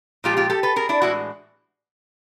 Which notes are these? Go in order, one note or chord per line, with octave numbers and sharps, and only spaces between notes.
A#2 F3 G#3 F4 G4
F4 G4
G4 A4
A4 B4
G#4 A#4
D4 E4
A2 E3 G#3 E4 F#4